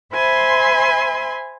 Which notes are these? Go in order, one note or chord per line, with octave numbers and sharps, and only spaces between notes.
C5 E5 G#5 B5 C6